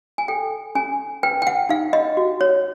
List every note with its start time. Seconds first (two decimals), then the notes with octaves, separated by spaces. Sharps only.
0.18 G#5
0.28 A4 G5
0.75 C#4 G#5
1.23 B4 G5
1.42 G5
1.47 F#5
1.69 D#4 F5
1.93 D#5
2.17 F#4
2.41 C#5